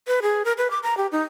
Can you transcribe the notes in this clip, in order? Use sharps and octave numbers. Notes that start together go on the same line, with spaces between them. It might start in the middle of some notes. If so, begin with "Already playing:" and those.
B4
G#4
A#4
B4
D6
A#5
G4
D#4